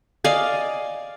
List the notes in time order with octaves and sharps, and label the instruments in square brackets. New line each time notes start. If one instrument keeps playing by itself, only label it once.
[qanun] D5 D#5 F5 G#5